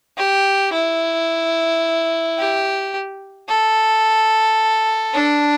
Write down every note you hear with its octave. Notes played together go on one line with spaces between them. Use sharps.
G4
E4
G4
A4
D4